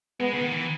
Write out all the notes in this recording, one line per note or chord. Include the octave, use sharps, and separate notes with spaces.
G#3 B3
C#3
D#3
E3